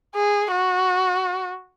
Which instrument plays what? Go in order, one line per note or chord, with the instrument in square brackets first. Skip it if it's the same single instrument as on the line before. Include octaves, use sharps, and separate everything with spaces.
[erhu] G#4
F#4